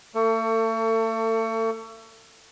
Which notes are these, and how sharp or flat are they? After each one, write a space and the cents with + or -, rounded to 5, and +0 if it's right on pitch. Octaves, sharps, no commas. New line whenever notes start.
A3 +40 A4 +30